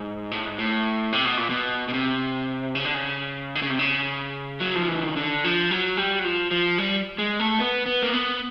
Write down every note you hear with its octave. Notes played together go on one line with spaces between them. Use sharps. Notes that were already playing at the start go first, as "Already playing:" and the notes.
Already playing: G#2
A2
G#2
A2
C3
B2
A#2
B2
B2
C3
C#3
D3
C#3
D3
C#3
C3
C#3
F#3
F3
E3
D#3
D3
F3
F#3
G3
F#3
F3
F3
G3
G#3
A3
B3
B3
A#3
B3